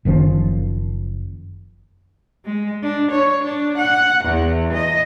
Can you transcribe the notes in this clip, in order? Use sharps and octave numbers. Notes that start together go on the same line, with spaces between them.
F#1 D#3 F3 C#4
G#3
D4
C#5
D4
F#5
E2
D#5